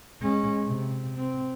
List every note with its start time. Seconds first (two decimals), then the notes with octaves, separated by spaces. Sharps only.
0.22 G#3 C#4
0.66 C3
1.17 C4